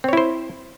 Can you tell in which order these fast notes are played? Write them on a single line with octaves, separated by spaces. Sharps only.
C4 C#5 E4 C5